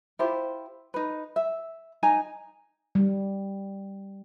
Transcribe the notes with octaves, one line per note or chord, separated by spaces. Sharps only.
E4 F4 G4 C5
D#4 B4
E5
D#4 G#5 A#5
G3